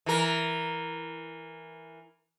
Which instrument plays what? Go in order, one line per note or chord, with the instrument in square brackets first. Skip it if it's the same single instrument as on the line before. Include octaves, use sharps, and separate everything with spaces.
[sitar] E3 A#4